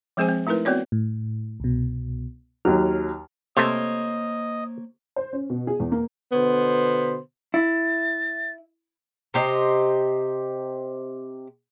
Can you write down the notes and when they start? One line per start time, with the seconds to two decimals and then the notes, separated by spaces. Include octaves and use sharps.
0.17 F3 G#3 C4 G#4 C5 G#5
0.29 C4
0.47 A3 D#4 E4 A#4 B4
0.65 B3 C4 F#4 C#5 D5
0.92 A2
1.60 C2 B2
2.65 D#2 F#3 F6
3.57 C3 A3 A#3 C5 C#5 D#5
5.16 C5
5.33 C#4
5.50 B2
5.67 G#4
5.80 E2
5.92 A#3
6.32 B2 D3 B3 C5
7.54 E4 A6
9.34 C3 G4 C5 D#5